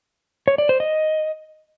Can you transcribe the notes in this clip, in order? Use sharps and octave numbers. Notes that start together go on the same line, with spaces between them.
C#5
D5
C5
D#5